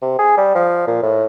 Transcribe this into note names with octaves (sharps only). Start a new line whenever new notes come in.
C3
G#4
G3
F3
A#2
A2